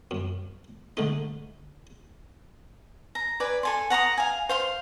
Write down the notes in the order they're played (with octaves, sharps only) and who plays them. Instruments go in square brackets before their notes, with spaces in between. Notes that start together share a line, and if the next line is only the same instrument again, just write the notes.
[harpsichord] F#2
D3 A3 D#4
[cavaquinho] A#5
B4 D5 G#5
A4 G#5 C6
F#5 A#5 C6 D#6
F5 G#5
C5 F5 C6